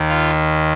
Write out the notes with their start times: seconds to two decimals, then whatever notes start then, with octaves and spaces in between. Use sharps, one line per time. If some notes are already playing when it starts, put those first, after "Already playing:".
Already playing: D#2 D#3
0.09 F4